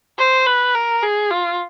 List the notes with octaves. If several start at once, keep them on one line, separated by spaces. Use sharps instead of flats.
C5
B4
A#4
G#4
F4